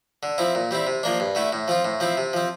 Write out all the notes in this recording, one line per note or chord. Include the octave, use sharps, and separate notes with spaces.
D3
F3 C4 E4
A#2
G3 C4 E4
C3
F3 A#3 D4
G2
D3 A3 E4
A2
F3 C4 F4
A2
F3 C4 E4
C3
F3 C4